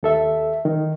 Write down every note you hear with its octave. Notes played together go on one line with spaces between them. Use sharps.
D#2 A4 E5
D#3